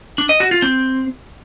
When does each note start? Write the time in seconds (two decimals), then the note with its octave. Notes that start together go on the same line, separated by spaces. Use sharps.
0.18 D4
0.29 D#5
0.40 F#4
0.51 F4
0.62 C4